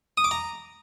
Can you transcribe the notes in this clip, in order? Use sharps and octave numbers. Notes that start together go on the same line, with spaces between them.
D#6
D6
A#5